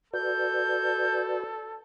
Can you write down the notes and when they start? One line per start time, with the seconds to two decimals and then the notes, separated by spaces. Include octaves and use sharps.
0.14 F#4 A4 B4 D5 G6